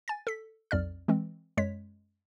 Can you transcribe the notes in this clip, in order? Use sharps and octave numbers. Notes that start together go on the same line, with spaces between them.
G#5 A6
A4 B6
B1 F2 D5 F6
E3 G#3 C4
F#2 G#3 C#5 B6